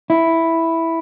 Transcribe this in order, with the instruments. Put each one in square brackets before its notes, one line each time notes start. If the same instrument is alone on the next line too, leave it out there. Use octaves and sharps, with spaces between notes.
[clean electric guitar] E4